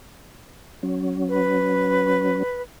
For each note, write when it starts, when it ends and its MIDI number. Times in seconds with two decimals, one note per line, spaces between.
0.83 2.43 54
0.83 2.43 61
1.29 2.62 71